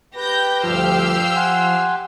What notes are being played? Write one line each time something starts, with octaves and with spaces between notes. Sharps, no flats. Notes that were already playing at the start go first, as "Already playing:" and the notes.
G4 B4 G5 G6 A#6
D2 G2 F3 E6 F6 C7
F#5 G#5 C6